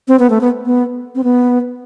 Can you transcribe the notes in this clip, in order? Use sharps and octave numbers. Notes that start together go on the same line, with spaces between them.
C4
B3
A3
B3
B3
C4
B3